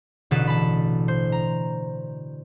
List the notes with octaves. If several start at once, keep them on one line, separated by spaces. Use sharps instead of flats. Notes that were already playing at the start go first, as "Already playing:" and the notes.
A1 B2 D3 B4 A6 E7
A5 B5
C5
A#5